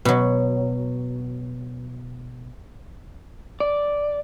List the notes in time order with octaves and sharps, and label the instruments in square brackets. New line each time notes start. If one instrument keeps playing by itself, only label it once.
[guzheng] B2 F#3
[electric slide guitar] D5